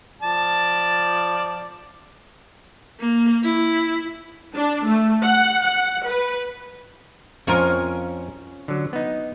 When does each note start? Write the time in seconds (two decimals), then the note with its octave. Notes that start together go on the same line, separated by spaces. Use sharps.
0.22 F3 D5 A5
3.00 A#3
3.44 E4
4.56 D4
4.86 A3
5.24 F#5
5.63 F#5
6.09 B4
7.47 F2 F3 C#4 F4 A#4
8.68 D3 F#3
8.93 B3 D#4